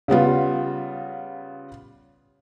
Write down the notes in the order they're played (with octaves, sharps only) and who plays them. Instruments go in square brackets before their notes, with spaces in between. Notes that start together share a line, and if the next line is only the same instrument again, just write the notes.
[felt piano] C#3 G3 B3 F4